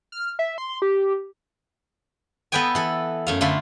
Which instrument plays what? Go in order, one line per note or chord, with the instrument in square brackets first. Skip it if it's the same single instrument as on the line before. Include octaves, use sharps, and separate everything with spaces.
[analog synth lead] F6
E5
C6
G4
[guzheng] B3 A4 B4 D#5 G5 G#5
E3 A4
F#2 A3 F5
D3 A3 F4 B5 C6